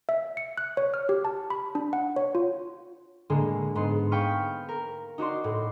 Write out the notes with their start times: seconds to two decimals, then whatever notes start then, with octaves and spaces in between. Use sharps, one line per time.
0.09 E5
0.37 C#7
0.58 F#6
0.77 C#5
0.94 F6
1.09 G4
1.25 A5
1.50 B5
1.75 D4
1.93 F#5
2.16 C#5
2.35 F4
3.30 A2 D3 G#3 A#3
3.75 G#2 B3 C6
4.11 F5 G5 B5 C#6 D#6 F6
4.69 A#4
5.18 D#4 F#4 D5 C6
5.44 A2